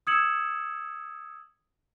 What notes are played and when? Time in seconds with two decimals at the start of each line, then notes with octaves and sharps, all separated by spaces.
0.07 D#6 E6 G#6 C#7 E7 F#7